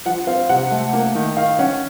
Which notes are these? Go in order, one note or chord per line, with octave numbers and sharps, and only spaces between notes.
F3 F#5
C4 F5
C3 F#5
A3
A#3
D#3
D#3 F5
C#4 F#5